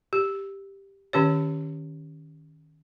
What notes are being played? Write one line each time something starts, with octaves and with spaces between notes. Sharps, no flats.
G4
D#3 C#4 G4 C#5